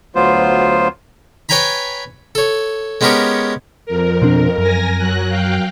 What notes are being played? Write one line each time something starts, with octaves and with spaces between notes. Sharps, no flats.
D2 F#3 B3 F4 C5
B4 C#5 G5 G#5 A#5 B5
A4 C#5
G#3 B3 C#4 G4 A#4 C#5
F2 A#4
B2 C4 D4
F#2 A#4 G#5 A#6
F#3 F#6
F5 G5